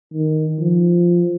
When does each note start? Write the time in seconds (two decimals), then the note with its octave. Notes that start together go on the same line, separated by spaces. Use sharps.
0.14 D#3
0.60 F3